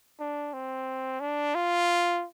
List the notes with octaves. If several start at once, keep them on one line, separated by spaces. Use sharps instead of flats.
D4
C4
D4
F4